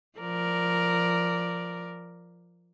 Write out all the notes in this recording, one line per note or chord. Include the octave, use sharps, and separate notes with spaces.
F3 A#4 D5